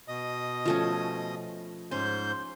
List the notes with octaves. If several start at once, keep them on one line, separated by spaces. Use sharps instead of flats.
B2 D#5 D#6
F3 A3 C#4
G#2 C#4 C5 G6